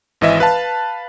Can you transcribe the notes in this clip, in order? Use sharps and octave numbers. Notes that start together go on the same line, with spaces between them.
G#1 E3 D#5 E5
B4 F5 A5